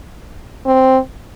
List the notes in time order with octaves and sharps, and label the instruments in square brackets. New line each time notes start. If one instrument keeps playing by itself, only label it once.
[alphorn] C4